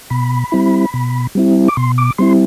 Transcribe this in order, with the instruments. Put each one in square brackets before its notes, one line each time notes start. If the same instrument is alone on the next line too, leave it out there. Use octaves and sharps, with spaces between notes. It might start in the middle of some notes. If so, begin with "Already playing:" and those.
[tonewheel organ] B2 B5
G3 C4 E4
B2
G3 C4 E4
D6
B2 C6
D6
G3 C4 E4 C6